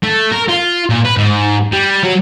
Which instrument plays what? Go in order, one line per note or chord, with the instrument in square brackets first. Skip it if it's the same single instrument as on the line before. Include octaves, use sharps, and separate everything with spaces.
[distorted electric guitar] A3
A#4
F4
A#2
B4
G#2
G3
F#3